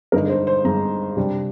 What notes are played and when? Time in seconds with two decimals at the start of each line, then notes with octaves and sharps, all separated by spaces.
0.12 G2 D3 G#3 D#4 A#4
0.29 C5
0.47 C5
0.64 G2 D3 G#3 D#4 A#5
1.17 C3 G3 D4